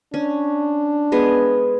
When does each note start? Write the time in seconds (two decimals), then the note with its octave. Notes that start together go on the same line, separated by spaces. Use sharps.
0.14 C#4 D4
1.12 G#3 B3 G#4